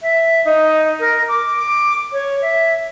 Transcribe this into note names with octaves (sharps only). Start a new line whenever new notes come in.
E5
D#4
A#4
D6
D6
C#5
E5